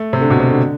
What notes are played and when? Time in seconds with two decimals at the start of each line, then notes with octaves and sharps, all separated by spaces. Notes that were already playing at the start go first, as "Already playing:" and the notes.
Already playing: A3
0.13 C3
0.21 D3
0.30 B2
0.40 C3
0.49 D3